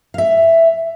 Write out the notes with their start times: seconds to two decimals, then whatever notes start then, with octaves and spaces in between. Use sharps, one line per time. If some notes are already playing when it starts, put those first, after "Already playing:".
0.14 E5 F5